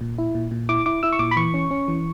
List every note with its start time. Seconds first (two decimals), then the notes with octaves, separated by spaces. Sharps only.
0.01 A#2
0.19 E4
0.35 A#2
0.51 A#2
0.69 E4 D6
0.86 E4 D6
1.03 E4 E6
1.12 C#6
1.19 A#2 D6
1.31 B5
1.36 E3 C#6
1.54 C#4
1.71 C#4
1.88 E3